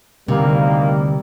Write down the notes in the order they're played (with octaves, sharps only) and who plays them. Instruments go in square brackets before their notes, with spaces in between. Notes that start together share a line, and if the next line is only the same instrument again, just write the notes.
[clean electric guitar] D2 [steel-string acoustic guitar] C3 [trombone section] D#3 A#3 [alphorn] G3